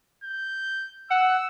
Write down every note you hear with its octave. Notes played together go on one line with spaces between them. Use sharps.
G6
F#5 E6